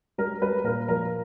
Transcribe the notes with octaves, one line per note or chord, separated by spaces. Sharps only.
G3 A#4
G3 B4
A#2 A#4
F3 A#4